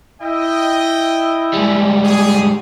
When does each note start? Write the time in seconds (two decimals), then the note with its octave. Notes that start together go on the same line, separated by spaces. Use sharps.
0.21 E4 D#5 E5 G5
1.53 G#2 G3
2.05 G#4